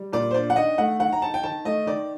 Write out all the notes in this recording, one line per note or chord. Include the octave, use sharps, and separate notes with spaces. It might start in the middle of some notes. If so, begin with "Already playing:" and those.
Already playing: G3
A#2 D5
C5
D4 D5
F#5
D#3 D#5
A3 F#5
D#3 F#5
A#5
D#4 A5
G5
D#3 A5
A3 D#5
D#3 D5